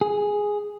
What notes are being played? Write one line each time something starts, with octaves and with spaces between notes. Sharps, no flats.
G#4